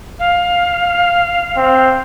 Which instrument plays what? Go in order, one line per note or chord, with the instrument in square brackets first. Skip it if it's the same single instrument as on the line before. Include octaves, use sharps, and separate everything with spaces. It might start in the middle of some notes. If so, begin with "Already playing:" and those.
[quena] F5
[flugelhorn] C4